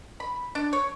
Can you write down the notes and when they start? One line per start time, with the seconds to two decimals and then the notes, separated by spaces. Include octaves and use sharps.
0.20 B5
0.55 D4
0.73 C#5